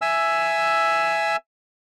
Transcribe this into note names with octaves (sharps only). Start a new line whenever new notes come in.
E5 G#5 E6